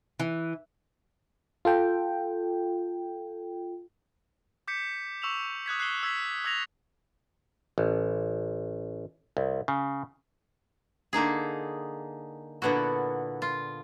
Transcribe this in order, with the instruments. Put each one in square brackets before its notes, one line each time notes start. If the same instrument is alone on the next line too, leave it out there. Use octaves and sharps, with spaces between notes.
[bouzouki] E3
[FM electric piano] F4 A4 G5
[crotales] D6 G6 B6 C#7
C#6 E6 E7 F7
D#6 F#6 G#6 B6
F#6 C7 F#7 G7
E6 G#6 B6
D#6 E6 G#6 A#6 F7
[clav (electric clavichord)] A1
C2
C#3
[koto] D3 A#3 D#4 G#4
A#2 D3 B3 E4 F#4
F4